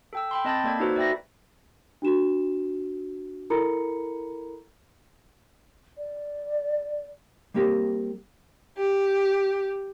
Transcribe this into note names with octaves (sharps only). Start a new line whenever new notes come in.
A4 G5 E6
G5 B5 C6
C4 D#5 A5 B5 G6 A6
A#3 A4 D5 G#6
D#4 F#4 A4 B4 C5
D5 E5 G5 B5 A#6
D4 F#4 E7
E4 A4 A#4 A#5 B5 C#7
D5
G3 A#3 C4 G4 A#4
G4